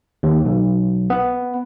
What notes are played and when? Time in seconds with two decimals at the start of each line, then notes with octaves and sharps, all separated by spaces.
0.23 D#2
0.45 B1
1.10 B3